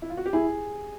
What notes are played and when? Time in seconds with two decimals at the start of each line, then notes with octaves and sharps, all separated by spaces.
0.02 E4
0.10 F4
0.17 F#4
0.26 G4
0.33 E4 G#4